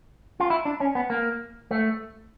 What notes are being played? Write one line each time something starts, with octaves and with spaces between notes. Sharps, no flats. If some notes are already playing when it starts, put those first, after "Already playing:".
F4
E4
D4
C#4
B3
A#3
A3